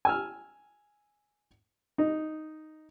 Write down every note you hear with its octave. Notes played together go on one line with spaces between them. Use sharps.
G#5 E6 F6
D#4